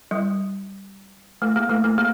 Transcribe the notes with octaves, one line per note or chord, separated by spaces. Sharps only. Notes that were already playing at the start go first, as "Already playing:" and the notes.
G3
A3
A#3
A3
A3
A#3